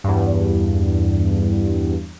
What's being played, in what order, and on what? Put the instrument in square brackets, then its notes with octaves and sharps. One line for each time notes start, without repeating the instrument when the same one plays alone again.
[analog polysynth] E2 G2